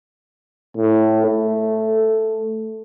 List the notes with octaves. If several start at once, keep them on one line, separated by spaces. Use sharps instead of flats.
A2
A3